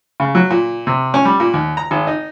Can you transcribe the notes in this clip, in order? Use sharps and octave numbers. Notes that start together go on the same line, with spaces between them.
C#3
F#3
A#2
C3
C#4
G3
A#2
D#2
A#5
G#1
D#4